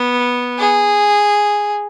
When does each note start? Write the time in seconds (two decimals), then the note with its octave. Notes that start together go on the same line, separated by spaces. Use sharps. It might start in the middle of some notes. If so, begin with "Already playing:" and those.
Already playing: B3
0.59 G#4